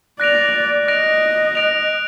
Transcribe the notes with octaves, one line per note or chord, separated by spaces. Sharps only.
D5 F#6 A#6 D7 F7
D#5 F#6 A#6 D7 F7
F#6 A#6 D7 F7